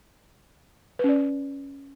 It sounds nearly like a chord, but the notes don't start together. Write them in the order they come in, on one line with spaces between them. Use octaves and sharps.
B4 C#4 D5